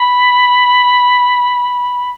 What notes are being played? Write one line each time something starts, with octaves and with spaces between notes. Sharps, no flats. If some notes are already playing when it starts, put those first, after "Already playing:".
Already playing: B5